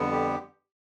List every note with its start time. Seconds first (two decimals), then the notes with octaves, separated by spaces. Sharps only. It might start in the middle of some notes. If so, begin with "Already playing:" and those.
Already playing: F2 D3 G3 B3
0.11 G4